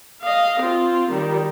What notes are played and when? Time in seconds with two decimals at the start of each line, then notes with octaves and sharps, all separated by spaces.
0.22 D#5 F5
0.61 C4 F4
1.11 D#3 G3